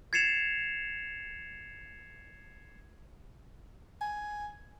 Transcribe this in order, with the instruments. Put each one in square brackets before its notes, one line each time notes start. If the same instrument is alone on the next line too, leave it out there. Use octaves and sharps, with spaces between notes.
[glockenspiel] G#6 A6 C7 C#7 E7 F7
[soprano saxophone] G#5